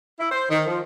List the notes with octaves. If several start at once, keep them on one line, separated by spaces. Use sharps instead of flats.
E4
C5
D#3
F3